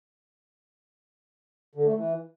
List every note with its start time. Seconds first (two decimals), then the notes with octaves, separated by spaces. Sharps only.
1.75 D3
1.85 A3
1.95 E3